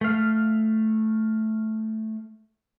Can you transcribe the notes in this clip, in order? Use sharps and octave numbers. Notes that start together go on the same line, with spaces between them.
A3 F5